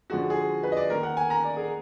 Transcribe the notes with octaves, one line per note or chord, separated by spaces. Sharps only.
D3 F3 G#3 F#4
G#4
B4
D#5
D5
D#3 A#3 A#4
F#5
G#5
A#5
D5
G#4